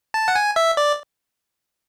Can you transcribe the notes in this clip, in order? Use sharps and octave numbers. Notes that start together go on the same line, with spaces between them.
A5
F#5
G#5
E5
D5